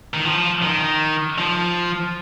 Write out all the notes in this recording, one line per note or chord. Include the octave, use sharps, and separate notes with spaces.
D#3
F3
D#3
F3